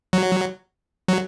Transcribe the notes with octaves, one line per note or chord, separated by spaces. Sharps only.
F#3
F#3